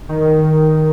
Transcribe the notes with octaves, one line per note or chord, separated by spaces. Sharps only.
D#3